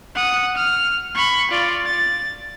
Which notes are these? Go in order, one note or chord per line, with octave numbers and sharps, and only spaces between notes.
F#5 D#6
F6
B5 C#6
F4 D5
A6